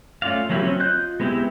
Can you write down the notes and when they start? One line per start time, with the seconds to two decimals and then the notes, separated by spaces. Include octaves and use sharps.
0.22 A3 C#4 F4 D5 F5
0.49 F3 F#3 A#3 E4 G4
0.61 F#3 C4 C#4
0.80 F4 D#5 F#6 G6
1.20 G#3 B3 C4 E4 G4